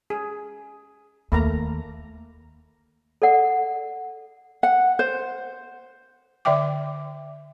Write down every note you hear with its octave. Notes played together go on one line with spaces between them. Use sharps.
G#4
D#2 A3 A#3 A#5
A4 D5 F#5
F#5
C5
D3 D5 E5 G5 D6